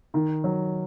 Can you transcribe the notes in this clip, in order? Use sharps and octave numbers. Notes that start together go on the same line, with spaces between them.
D#3
F#3